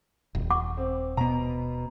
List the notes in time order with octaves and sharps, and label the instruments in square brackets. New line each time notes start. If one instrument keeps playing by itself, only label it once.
[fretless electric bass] D#1
[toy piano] F#5 C#6 D6
[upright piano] C4
[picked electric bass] B2 B3 [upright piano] A#5